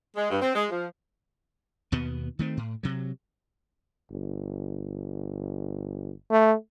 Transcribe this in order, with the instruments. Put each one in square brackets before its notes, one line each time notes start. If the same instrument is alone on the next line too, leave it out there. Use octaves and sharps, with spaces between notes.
[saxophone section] G#3
G2
C4
G#3
F3
[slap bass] D#2 B2 B3
D#3 A3 C4
A2
C3 F#3
[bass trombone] G1
A3